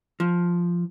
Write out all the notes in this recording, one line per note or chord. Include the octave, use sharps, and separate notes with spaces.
F3